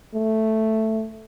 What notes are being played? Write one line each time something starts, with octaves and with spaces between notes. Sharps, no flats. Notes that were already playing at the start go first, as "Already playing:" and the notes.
A3